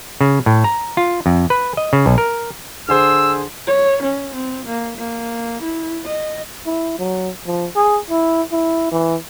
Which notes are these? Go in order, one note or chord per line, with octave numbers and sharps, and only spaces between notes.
C#3
A2
A#5
F4
F2
B4
D#5
C#3
B1
A#4
D3 G#4 C5 E6
C#5
C#4
C4
A#3
A#3
E4
D#5
E4
F#3
F3
G#4
E4
E4
E3